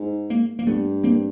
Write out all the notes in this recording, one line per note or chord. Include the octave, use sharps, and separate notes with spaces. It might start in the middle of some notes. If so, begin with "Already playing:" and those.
Already playing: G#2
G#3 A#3
A#3
G2 A3 B3
A#3 C4